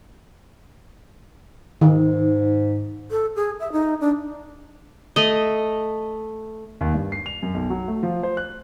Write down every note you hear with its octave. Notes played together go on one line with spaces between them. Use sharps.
G#2 D#3
A4
G#4
E5
D#4
D4
A3 D#5
D#2
G2
C7
F7
F#2
B1
F#3
A3
F3
C5
F#6